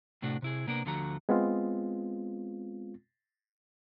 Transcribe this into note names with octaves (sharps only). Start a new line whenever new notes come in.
A2 C3 A3 D4 F#4
C3 E4 G#4
C3 A#3 B3 D4 A#4
D2 D3 F3 A3 F#4 A#5
G#3 B3 C4 F4